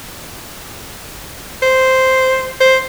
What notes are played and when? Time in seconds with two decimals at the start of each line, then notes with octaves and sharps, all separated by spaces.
1.63 C5
2.60 C5